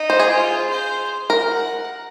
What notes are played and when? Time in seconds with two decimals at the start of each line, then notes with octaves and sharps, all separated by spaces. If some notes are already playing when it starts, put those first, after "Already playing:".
Already playing: D#4
0.10 C5
0.19 G#4
0.29 F4
0.70 C5
1.30 A#4
1.50 F#5